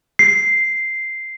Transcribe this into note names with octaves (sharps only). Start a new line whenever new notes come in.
C7